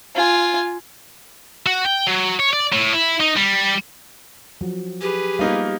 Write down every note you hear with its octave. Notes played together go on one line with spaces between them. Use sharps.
F4 G#5
F#4
G5
F#3
C#5
D5
A2
E4
D#4
G3
F3 F#3
G4 G#4 B4
G3 A#3 B3 D#4 F4 A#4